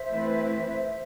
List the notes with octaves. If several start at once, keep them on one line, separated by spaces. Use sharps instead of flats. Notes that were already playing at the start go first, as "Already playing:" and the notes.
Already playing: C5 E5
E3 A3 C4 E4 B4